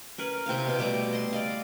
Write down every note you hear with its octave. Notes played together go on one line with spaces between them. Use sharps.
C#4 A#4 B4
C3 C4 E4 F5
B2 G5
B2 G3 A3 D6
D#5 C6
D5 D#5 F5